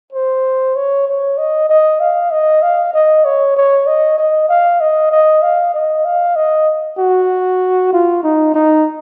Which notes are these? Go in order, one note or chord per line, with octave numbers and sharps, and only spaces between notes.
C5
C#5
C#5
D#5
D#5
F5
D#5
F5
D#5
C#5
C#5
D#5
D#5
F5
D#5
D#5
F5
D#5
F5
D#5
F#4
F4
D#4
D#4